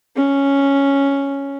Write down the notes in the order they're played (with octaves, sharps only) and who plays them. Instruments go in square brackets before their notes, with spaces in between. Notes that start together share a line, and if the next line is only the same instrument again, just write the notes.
[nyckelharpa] C#4